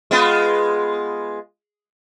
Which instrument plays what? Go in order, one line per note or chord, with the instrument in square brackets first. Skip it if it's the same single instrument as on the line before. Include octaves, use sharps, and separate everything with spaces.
[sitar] G#3 B3 F4